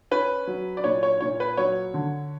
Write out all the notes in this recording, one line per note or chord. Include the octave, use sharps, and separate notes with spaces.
C#4 B4
F#3
D5
A#2 C#5
C#5
A#2 C#5
B4
F#3 C#5
D3